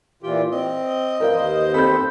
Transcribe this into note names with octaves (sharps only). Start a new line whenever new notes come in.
A#2 E3 F4 G4
C4 D#5
A#4 B4 F5 G5
D#2 C5
C4 A4 B5 G6